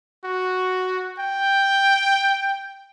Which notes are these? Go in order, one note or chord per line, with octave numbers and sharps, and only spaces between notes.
F#4
G5